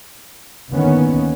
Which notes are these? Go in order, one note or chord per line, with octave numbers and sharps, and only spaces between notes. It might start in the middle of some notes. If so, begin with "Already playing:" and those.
D2 D3 D#3 A#3 B3 C#4